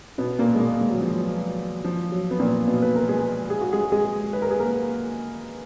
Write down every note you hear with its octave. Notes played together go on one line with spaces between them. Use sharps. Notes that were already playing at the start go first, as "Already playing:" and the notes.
B2 B3
A#2 A#3
G#3
A#2 A#3
G#3
F#3
F3
F#3
F3
F#3
B3
A#2 A#3
B2 B3
B4
A#4
G#3 G#4
G#4
F#4
G#3 G#4
G#3 G#4
B4
A#4
G#4
A#3 A#4